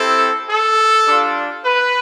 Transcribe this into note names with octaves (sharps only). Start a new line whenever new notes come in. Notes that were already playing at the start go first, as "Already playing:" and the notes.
Already playing: C4 E4 G4 A4
A4
G3 D4 F4
B4